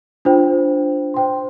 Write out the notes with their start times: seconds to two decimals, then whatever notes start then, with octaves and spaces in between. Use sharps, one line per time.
0.25 D4 F4 C5 G5
1.14 C5 G5 C6